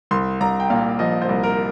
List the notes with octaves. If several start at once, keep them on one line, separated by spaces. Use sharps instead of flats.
C2 C6
C2 A#5
G5
A#2 F5
F3 D#5
C5
C2
A#4